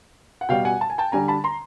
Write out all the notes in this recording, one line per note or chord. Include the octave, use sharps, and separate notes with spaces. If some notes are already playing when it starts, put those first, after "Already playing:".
F#5
B2 G3 F5 G5
F#5 G#5
A5
G#5
G5 A5
D3 G3 G#5 A#5
A5 B5
A#5 C6